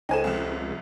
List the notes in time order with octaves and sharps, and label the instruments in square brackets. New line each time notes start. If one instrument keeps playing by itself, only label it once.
[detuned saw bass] C#2 [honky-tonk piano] D#4 G#5 E7 [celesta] A4 C5 G5
[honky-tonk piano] C2 F2